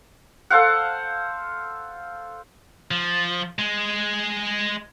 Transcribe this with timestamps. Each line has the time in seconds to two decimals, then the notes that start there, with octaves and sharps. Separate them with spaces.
0.50 A4 C5 F5 F#5
2.91 F3
3.59 G#3